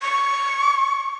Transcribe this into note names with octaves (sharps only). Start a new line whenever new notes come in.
C#6